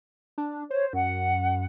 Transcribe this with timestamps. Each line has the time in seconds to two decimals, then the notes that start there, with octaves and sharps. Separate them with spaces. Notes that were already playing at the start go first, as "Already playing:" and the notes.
0.38 D4
0.71 C5 C#5
0.93 F#2 F#5